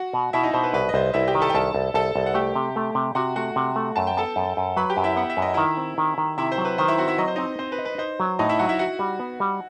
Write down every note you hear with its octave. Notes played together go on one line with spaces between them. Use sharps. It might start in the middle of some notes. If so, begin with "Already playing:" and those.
Already playing: F#4 F#5
B2
B2 E4 E5
D#4 D#5
B2 C5
B4
C2 B4
D#5
C2 C5
C2 E4 E5
G4 G5
D#3
A4 A5
G5
C2 A4 A5
C2
C2 A4 A5
C2
F#5
A3 G4 G5
C3
A3
C3
C3 F#4 F#5
A3 F#4 F#5
C3
A3
F#2 A5
G5
B3 A4 A5
F#2
F#2
F#3 B4 B5
G4 G5
F#2
E4 E5
B3 F#5
E5
F#2
D#5
D#3 E4 E5
C4
D#3
D#3
C3 E4 E5
C5
F#3
B4
D#3 C5
E4 E5
C4 F#4 F#5
E4 E5
F#3 D#5
C5
C4 D#4 D#5
C4 C5
B4
D#4
B4
D#4 C5
F#3
A2 D#4 D#5
E4 E5
F#3 F#4 F#5
E4 E5
E4 F#4 F#5
G3
B3
G3